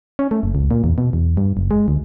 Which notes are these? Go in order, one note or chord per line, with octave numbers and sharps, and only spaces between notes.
C#4
A3
F#1
C#2
A#2
E2
B2
E2
G2
F#1
G#3
D2